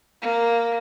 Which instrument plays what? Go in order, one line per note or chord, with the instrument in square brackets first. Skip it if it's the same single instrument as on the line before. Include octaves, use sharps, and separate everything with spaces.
[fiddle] A#3